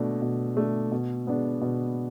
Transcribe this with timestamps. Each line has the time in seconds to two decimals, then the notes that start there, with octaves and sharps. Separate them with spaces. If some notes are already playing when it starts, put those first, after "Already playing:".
Already playing: B2 A3 D4
0.22 B2
0.57 A3 D4
0.92 B2
1.26 G#3 B3 D4
1.61 B2